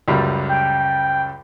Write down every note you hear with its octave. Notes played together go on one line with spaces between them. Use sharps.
C#2 F#2 G3
G5